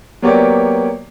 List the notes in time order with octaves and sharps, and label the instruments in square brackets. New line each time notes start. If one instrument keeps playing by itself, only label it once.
[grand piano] F#3 A#3 B3 G4 C#5 D5